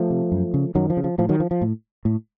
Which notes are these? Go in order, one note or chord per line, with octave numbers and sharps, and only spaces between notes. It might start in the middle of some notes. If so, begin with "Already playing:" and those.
Already playing: F3 A3
C3
F#2
C#3
F#2 D#3 F#3
F3
C#3
F3
A2 F3
D#3 F#3
F3
F3
A2
A2